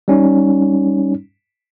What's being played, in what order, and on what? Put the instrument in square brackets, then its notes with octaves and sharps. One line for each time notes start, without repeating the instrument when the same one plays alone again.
[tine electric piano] G3 C#4 D#4